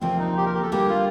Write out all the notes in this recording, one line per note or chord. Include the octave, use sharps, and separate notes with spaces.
D2 C3 F3 A#3 C4
D#4
G4
A#4
G4
A4
D3 G3 A#3 G4
F4